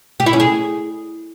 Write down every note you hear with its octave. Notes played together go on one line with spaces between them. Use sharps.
G4
E4
C#4
G#4